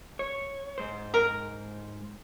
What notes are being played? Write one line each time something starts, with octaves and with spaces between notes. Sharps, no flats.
C#5
G#2 C5
A#4